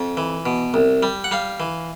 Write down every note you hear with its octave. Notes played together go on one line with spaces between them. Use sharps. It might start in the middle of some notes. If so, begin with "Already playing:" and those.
Already playing: F2
E3
B2
C2
G3
F#5
G3 F5
E3